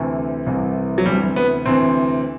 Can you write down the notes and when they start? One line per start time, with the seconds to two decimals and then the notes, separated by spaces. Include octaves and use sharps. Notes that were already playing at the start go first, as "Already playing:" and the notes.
Already playing: D2 C3 E3
0.46 C2 C3 E3
0.98 F#3
1.06 D2 C3 E3 G3
1.36 B3
1.66 D2 C3 E3 C4